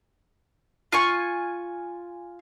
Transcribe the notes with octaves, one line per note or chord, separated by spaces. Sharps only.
F4 G#5 C#6